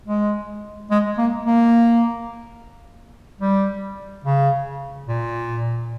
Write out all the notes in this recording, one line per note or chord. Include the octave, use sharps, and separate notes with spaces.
G#3
G#3
A#3
A#3
G3
C#3
A#2